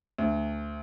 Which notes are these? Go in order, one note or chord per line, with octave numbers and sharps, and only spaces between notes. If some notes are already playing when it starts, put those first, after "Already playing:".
D2